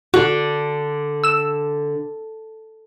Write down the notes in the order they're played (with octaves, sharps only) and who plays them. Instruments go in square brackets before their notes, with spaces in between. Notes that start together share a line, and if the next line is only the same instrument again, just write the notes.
[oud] D3 [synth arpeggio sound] F#4
[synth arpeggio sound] E6 E7